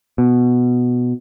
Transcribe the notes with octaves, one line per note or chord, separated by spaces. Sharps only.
B2